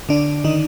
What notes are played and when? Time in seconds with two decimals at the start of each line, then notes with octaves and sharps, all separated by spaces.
0.09 D3 D4
0.44 D#3 D#4